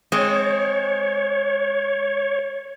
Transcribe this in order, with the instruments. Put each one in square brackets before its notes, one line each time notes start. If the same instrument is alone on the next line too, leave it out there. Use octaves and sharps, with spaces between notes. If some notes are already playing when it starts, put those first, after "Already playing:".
[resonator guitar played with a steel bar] G#3 C4 [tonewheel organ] C#5